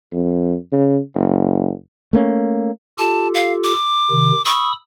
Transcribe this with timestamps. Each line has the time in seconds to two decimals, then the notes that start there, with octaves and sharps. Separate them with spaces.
0.12 F2
0.72 C#3
1.15 F#1
2.13 A3 A#3 C#4
2.98 F4 G4 A4 A5
3.34 F5
3.64 D6
4.11 C3 D#3
4.45 B5 C#6 D#6 E6